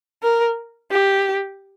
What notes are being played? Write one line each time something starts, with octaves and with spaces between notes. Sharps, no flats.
A#4
G4